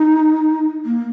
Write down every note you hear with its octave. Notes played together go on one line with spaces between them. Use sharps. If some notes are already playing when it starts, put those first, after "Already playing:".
Already playing: D#4
A#3